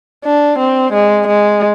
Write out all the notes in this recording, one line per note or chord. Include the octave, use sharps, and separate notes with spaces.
D4
C4
G#3
G#3